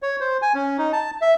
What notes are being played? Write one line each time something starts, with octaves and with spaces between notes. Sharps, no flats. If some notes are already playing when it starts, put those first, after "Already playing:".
C#5
C5
G#5
C#4
D#4
A5
E5